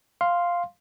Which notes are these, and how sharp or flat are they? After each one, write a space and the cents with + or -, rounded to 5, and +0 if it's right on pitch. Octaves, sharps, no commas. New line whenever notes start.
F5 +0 C6 +0